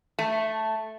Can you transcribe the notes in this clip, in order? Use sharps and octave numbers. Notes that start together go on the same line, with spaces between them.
A3